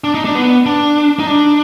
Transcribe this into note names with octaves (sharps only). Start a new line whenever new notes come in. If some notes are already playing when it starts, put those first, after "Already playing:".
D4
D#4
D4
B3
D4
D#4
D4